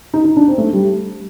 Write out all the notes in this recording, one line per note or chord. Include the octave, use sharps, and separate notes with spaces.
D#4
D#4
D4
C4
A3
G3